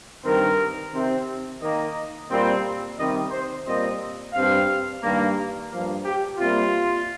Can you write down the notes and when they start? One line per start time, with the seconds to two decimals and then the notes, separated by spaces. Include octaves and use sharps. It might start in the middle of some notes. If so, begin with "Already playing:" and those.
0.23 G2 D#3 C4 A#4
0.92 C3 D#3 C4
1.60 D#3 A#3 D#5
2.28 A#2 G3 C4
2.97 C3 D#3 G3 C4 D#5
3.31 C5
3.65 A#2 G3 C4 D#5
4.33 G2 G3 C4 F5
5.01 G2 D#3 A#3
5.70 G2 F3 A#3 F5
6.04 G4
6.38 C3 G3 A#3 F4